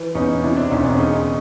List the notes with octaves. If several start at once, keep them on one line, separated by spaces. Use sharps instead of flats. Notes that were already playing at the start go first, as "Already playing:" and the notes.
Already playing: E3
E2 C#4 D#4
C3 D4 E4
C4 D4
E1 C#4 D#4
C4 D4
C#3 C#4 D#4